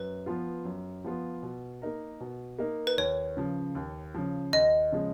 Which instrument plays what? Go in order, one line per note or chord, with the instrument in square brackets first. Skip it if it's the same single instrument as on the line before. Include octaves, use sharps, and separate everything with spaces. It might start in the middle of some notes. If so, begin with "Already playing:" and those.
Already playing: [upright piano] F#2 [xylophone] B4
[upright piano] F3 B3 F4
F#2
F3 B3 F4
B2
A#3 D#4 A#4
B2
A#3 D#4 A#4
[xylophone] B4
[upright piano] D#2 [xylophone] C#5
[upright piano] C#3 F3
D#2
C#3 F3
[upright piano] D#2 [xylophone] D#5
[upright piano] C#3 F3 G#3